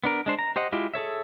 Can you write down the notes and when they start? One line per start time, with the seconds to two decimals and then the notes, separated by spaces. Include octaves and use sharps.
0.04 B3 D4 A#4
0.26 G#3 D4 C5
0.39 A#5
0.56 G4 C5 D#5 F#5
0.72 G#3 E4 F4 G4
0.94 G#4 A4 C#5 E5